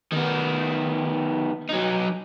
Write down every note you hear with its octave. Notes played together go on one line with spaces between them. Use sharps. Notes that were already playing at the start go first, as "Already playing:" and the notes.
D#3 B3
F#3 D#4